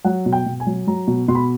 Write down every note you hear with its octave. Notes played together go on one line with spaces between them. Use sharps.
F#3 F#5
B2
G5
B2
G#5
F#3
F#3 A#5
B2
B2 C6
B5